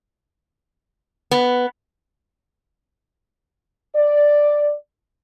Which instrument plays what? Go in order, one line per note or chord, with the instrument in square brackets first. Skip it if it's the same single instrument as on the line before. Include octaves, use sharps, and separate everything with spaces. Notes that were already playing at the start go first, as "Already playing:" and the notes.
[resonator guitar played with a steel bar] B3
[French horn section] D5